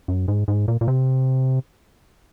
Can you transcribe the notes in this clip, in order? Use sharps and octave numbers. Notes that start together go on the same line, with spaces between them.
F#2
G#2
G#2
A#2
A#2
C3